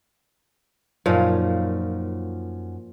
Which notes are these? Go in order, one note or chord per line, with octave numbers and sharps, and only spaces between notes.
F#2 A#2 F3 D#4